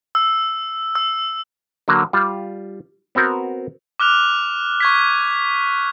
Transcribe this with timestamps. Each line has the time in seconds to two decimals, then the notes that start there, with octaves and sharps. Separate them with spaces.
0.15 E6
0.95 E6
1.88 D3 F#3 A#3
2.13 G3 F4
3.15 B3 C4 F#4 A#4
4.00 D6 F6 F#6 F7
4.80 C#6 G#6 B6